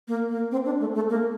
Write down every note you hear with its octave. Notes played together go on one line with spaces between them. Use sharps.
A#3
A#3
C4
D4
A3
A3
A#3